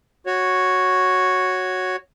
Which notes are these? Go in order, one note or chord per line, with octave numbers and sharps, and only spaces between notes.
F#4 C#5